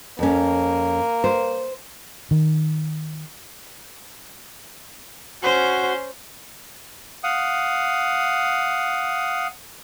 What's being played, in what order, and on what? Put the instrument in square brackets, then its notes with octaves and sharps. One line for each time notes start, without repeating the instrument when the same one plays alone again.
[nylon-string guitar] F2 C#4 [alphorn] A#3
[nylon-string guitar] C5
[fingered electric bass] D#3
[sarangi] C#4 [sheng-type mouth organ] F#4 [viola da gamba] C5
[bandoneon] F5 F#5 D#6